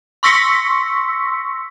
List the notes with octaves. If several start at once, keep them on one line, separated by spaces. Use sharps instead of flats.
C6 C#6 E6 A#6 B6 C#7